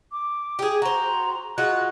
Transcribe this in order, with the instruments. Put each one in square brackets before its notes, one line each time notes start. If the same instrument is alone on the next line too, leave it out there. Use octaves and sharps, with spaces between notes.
[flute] D6
[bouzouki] G4 G#4
[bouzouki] F#4 C5 [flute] A#5
[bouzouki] G#3 F4 F#4 [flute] F#6